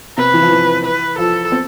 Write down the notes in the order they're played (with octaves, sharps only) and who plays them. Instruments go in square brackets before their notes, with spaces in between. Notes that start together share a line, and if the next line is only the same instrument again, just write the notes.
[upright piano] C3 [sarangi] B4
[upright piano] E3
F3
E3
[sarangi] B4
[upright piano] F3 [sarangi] A4
[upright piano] C4